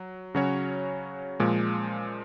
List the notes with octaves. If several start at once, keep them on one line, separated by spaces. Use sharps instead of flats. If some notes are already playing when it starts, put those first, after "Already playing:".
Already playing: F#3
C#3 F#3 C#4 F#4 C#5
A#2 F3 G#3